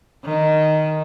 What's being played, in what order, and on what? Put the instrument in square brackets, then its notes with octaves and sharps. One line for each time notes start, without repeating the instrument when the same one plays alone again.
[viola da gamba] D#3